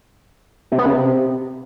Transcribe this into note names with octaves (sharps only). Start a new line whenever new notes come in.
C3
B3
C#3
C3